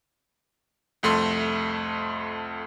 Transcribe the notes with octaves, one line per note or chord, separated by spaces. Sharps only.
C2 F2 A3 C6